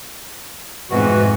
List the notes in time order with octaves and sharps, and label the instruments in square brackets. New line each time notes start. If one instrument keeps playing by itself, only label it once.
[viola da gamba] F2 G#2 B2 [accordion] E3 F#4